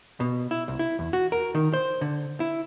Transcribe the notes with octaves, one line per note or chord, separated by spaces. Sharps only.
B2
E4
C2
E4
E2
F#4
A#4
D#3
C5
D3
E4